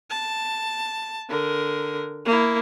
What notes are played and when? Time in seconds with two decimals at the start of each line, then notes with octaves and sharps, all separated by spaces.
0.10 A5
1.29 D3 A#4
2.25 A#3 E4